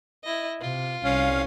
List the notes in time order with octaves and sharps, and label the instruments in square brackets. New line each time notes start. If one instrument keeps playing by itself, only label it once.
[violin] E4 D#5
[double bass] C3 [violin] F4
[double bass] C2 [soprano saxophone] C#4 [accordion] F5